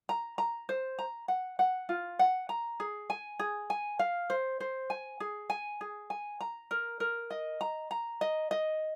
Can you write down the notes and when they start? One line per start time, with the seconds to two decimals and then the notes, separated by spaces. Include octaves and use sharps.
0.09 A#5
0.38 A#5
0.69 C5
0.99 A#5
1.28 F#5
1.59 F#5
1.89 F4
2.19 F#5
2.49 A#5
2.80 G#4
3.10 G#5
3.39 G#4
3.70 G#5
3.99 F5
4.30 C5
4.60 C5
4.90 G#5
5.20 G#4
5.50 G#5
5.81 G#4
6.10 G#5
6.41 A#5
6.71 A#4
7.00 A#4
7.30 D#5
7.61 A#5
7.91 A#5
8.21 D#5
8.51 D#5